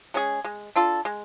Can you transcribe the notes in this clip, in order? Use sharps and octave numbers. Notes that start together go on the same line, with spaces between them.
G#3 C#4 G#4
G#3
D4 F4 A4
G#3